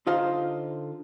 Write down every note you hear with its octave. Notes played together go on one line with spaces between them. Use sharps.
D3 D#4 F4 C5 F5 A#5